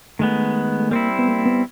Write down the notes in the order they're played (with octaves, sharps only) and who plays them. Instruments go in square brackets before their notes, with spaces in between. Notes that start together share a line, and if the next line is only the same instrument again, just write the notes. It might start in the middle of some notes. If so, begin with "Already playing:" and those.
[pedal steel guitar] D#3 G#3 B3 [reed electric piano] A3
[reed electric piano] A3
[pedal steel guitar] G3 C4 E4 [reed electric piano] A#3
[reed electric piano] B3
A#3
B3